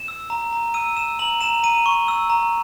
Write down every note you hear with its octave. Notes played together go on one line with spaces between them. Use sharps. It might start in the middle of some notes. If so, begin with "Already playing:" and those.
Already playing: E7
E6
A#5
A#5
E6 D#7
E6 E7
A#5 F#7
A#5 E7
A#5 D#7
C#6
E6
A#5